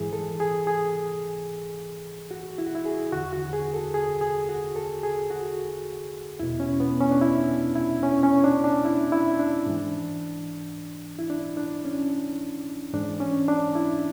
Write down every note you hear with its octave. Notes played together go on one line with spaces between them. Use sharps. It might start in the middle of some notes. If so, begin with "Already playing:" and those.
Already playing: G#2 E3 G#4
A4
G#4
G#4
F#4
E4
F#4
E4
G#4
E2 D3 F#4
F#4
G#4
A4
G#4
G#4
F#4
A4
G#4
F#4
E2 B2 E4
C#4
B3
C#4
D4
E4
E4
C#4
C#4
D4
D4
E4
E4
D4
G#2 E3
E4
D4
D4
C#4
G#2 E3 D4
C#4
D4
E4